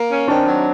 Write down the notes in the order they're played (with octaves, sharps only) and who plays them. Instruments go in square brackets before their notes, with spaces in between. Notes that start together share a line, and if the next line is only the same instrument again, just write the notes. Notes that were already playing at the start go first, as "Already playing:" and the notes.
Already playing: [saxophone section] A#3
C#4
[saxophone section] D#3 [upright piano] C4 D4
[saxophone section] F#3